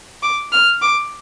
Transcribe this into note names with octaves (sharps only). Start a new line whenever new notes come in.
D6
F6
D6